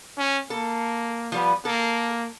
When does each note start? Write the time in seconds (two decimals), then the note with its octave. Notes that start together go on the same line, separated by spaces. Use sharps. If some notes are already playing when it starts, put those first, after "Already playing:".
0.18 C#4
0.50 A#3 A4
1.32 F3 G3 B3
1.65 A#3 A4